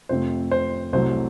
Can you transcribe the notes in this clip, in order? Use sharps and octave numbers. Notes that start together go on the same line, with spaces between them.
F2 C3 F3 A3 C4 C5
C5
C2 C3 F#3 A3 C5